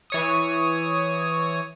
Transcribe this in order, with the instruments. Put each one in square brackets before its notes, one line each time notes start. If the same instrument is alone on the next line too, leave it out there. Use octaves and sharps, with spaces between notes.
[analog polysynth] E3 C#5 D#6